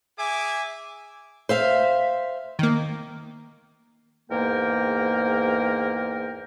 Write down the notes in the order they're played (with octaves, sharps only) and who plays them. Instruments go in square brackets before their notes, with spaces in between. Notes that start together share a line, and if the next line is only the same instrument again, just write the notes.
[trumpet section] G#4 E5 G#5 D6
[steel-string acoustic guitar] C5 E5 F5
[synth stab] D#3 A#3
[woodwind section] E2 G#2 A#3 A#4 G5